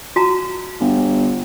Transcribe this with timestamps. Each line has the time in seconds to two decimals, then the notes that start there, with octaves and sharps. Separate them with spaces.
0.16 F#4 A5 A#5
0.81 G1